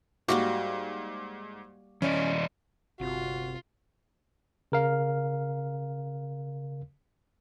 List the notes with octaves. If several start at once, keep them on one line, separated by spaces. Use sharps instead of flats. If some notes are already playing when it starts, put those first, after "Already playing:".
G#2 G3 A#3 F#4 D6
E3 C#4 D5 D#5
G1 C3 F4 F#4
C#3 A#4 F5